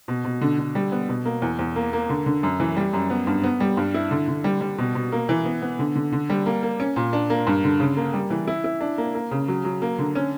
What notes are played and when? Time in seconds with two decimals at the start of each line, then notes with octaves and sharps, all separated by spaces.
0.08 B2
0.25 B2
0.41 D3
0.58 D3
0.75 G3
0.92 B3
1.09 B2
1.25 A#3
1.42 E2
1.59 E2
1.76 A#3
1.93 A#3
2.09 D3
2.26 D3
2.43 F#2
2.60 E3
2.77 G3
2.93 F#2
3.10 B3
3.27 G2
3.44 B3
3.60 G3
3.77 G2
3.94 E4
4.11 D3
4.28 D3
4.44 G3
4.61 G3
4.78 B2
4.95 B2
5.12 A#3
5.29 E3
5.45 B3
5.62 B3
5.79 D3
5.96 D3
6.12 D3
6.30 G3
6.46 A#3
6.63 A#3
6.80 C#4
6.96 A#2
7.13 D4
7.30 A#3
7.47 G2
7.64 D3
7.80 C#3
7.97 A#3
8.14 G3
8.30 E3
8.48 E4
8.64 E4
8.81 D4
8.98 A#3
9.15 A#3
9.31 C#3
9.48 F#3
9.65 F#3
9.82 A#3
9.98 D3
10.15 C#4